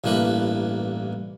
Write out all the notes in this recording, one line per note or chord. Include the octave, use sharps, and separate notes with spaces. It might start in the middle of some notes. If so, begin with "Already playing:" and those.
A1 G2 E3 A#3 B4 B5